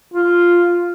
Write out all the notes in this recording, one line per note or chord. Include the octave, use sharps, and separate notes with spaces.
F4